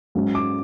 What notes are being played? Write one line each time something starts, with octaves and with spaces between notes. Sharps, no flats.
G#2 F#3 C#4
D6